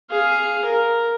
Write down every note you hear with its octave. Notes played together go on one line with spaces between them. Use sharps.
G#4 F5
A#4